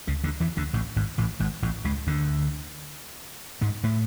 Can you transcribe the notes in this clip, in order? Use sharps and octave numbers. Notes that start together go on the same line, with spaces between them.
C#2 C#3
D2 D3
E2 E3
D2 D3
A1 A2
G#1 G#2
A1 A2
G#1 G#2
A1 A2
C#2 C#3
D2 D3
G#2 G#3
A2 A3